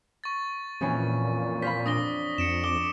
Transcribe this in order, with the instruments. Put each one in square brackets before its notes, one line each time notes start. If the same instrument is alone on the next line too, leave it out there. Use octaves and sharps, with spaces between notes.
[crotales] C#6 A6
[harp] F2 E3 C#4 [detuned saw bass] A#2
[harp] C5 F5 B5 [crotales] B6
[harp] D4 [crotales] D#6 A#6 G7
[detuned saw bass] F2 [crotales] C#7 D7 E7
[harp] D6 [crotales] G7